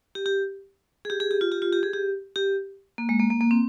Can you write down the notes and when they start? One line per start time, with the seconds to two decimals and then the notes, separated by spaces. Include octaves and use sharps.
0.15 G4
0.26 G4
1.05 G#4
1.10 G4
1.20 G#4
1.31 G4
1.41 F4
1.52 G4
1.62 F4
1.73 G4
1.83 G#4
1.94 G4
2.36 G4
2.98 A#3
3.09 G#3
3.19 A#3
3.30 A#3
3.41 A#3
3.51 C4